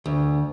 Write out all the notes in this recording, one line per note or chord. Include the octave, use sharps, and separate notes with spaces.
D2